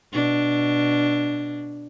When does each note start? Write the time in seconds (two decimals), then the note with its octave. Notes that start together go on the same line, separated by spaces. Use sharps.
0.13 B2 D4